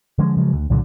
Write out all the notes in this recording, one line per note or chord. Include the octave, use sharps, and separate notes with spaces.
D3 F3 G#3 C#4
C#3 F3 F#3 G#3
D2
C2 A#2 D3 F#3